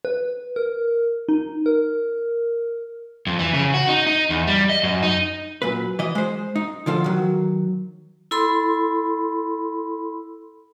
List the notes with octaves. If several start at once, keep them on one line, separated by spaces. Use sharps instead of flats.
B4
A#4
D#4
A#4
F2
E3
C#3
F#4
D#4
D#4
E2
G3
D#5
F#2
D#4
F#2 A#2 B4
E3 D#5
G#3 C5
D#4
D3 F3 F4 A4
D#3 F#3
E4 A4 B5 C6